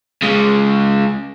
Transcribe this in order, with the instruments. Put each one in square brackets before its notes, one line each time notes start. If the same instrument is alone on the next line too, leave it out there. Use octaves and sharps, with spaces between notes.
[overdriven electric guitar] C#3 G#3